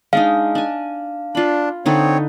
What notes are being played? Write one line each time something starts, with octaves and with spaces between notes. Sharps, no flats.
G#3 D4 D#4 F5
D4 G#5
D4 F4 B5
D3 C4 D#4 B4 C#5